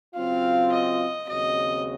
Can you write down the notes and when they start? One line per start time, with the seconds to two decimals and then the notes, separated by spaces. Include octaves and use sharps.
0.15 C#3 F#3 C4 F4 F5
0.72 D#5
1.28 D#2 C#3 F#3 C4 F#4 D#5